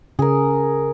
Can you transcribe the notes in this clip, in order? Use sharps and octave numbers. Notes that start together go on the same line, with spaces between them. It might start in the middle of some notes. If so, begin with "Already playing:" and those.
C#3 G#4 A#4